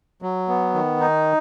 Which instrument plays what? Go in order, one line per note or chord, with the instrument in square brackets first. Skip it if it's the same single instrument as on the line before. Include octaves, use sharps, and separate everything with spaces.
[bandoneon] F#3
B3
D#3
D#4